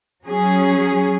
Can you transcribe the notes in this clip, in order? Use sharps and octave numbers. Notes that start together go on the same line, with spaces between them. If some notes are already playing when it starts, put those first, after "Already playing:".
F#3 C#4 G#4